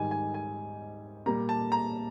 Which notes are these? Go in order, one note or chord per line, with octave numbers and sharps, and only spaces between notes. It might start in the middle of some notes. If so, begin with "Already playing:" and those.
Already playing: G#2 D#3 G3 G#5
G#5
G#5
A#2 G3 A#5
A5
A#5